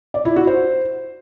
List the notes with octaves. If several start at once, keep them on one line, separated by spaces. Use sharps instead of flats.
D5
E4
F#4
C5